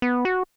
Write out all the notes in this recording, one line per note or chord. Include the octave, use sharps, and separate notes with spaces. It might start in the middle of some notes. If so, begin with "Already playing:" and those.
B3
F#4